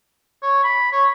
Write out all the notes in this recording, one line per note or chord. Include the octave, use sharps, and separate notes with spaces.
C#5
B5
C#5